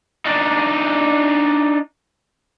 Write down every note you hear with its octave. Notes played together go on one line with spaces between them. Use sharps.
D4 D#4